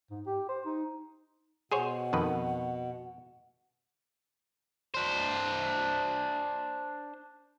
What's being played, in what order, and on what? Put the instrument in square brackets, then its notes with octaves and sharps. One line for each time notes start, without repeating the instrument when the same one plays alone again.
[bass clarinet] G#2
G4
C5
D#4
[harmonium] B2 [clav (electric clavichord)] G#4 C5 C#5 [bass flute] F#5
[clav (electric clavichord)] F2 D#3 B4
[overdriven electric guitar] D4 C5